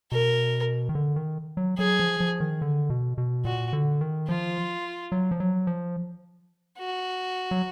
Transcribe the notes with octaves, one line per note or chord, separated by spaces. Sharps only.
B2 A#4
D#3
D3
D#3
F#3
F#3 G#4
F3
F3
D#3
D3
B2
B2
A#2 F#4
D3
D#3
F3 F4
F#3
F3
F#3
F3
F#4
F#3